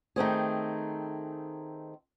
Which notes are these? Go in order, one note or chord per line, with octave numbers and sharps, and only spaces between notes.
D#3 A3 C4 G#4